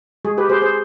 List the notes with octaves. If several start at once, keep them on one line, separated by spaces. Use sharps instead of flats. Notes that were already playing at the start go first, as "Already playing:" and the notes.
G#3 G#4
G4 B4
G4 G#4 C5
G#4 C5